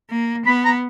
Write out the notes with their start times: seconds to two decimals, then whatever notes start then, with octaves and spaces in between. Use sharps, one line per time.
0.10 A#3
0.46 B3 B5
0.65 A#5